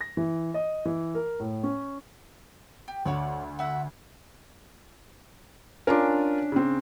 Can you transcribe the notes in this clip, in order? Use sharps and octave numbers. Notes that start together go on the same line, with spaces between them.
A#6
E3
D#5
E3
A#4
A2
C#4
G4
D2 F#4 C#5 D5
F#4 E5 F#5
C#4 D4 F4 A#4
C#3 C4